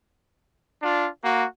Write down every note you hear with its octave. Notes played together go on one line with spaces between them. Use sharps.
D4 F4
A#3 F#4